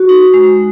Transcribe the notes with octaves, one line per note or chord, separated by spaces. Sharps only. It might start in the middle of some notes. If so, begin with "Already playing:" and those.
Already playing: F#4
D#4
G#3